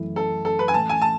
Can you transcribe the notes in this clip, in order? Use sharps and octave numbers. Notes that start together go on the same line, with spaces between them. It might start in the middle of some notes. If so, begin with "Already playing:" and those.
Already playing: F#2 E3 A3 E4
A4
A4
B4
G#5
A2 E3 A3 A5
G#5
A5